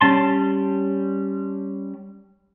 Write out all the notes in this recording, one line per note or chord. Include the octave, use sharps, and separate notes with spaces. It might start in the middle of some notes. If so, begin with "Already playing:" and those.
G3 C#4 A5 C6